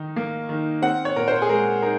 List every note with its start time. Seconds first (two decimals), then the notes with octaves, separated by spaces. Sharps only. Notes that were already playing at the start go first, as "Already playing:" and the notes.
Already playing: D#3 D#4
0.16 A#3
0.49 D#3
0.82 C4 F#5
1.05 C#5
1.16 A#2 A#4
1.28 C5
1.42 G#4
1.49 G#3 A#4
1.82 D#4 A#4